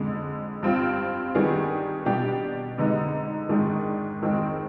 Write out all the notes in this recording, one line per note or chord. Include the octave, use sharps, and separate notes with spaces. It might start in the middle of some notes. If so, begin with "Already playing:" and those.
Already playing: F2 D3 G#3
G2 F3 C4 F4
D#3 G3 B3 D4 G#4
B2 G3 D4 G4
F2 D3 G#3 B3 D#4
G#2 D#3 G#3 D4
F2 D#3 G#3 C4